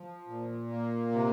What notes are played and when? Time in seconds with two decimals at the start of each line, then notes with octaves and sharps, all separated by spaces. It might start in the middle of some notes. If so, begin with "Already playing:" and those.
Already playing: F3
0.27 A#2
0.70 A#3
1.12 C3